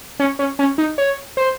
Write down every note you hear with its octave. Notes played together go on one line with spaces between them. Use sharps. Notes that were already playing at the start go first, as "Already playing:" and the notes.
C#4
C#4
C#4
D#4
C#5
C5